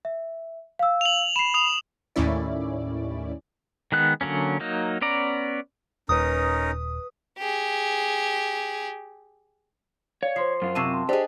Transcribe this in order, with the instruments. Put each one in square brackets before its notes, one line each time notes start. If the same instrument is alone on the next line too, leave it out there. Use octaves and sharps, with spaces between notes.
[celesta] E5
F5 E6
[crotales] F7 F#7
[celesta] B5 C7 [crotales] E7
[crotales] D#6 F7
[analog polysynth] D#2 A2 C#4 E4 D5
[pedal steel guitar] D#3 G#3 B3 F#6
D3 F#3 A#3 C#4
F#3 A#3 D#4
B3 C#4 D5 A#5
[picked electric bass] D#1 [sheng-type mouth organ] C#4 D#4 A#4 [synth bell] B4 D#6
[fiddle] G4 G#4
[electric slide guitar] C#5 [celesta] D5 F5
[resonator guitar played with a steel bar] F3 [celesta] C5 C6 C7
[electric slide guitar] F#2 F4
[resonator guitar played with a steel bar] C3 C4 A5 [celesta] C#6 C7 D#7
[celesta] C6
[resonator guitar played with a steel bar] D4 G#4 [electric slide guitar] G4 [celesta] C5 D#5